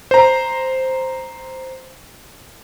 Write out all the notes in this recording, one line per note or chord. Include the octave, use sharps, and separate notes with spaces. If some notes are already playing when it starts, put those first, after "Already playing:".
C5 A#5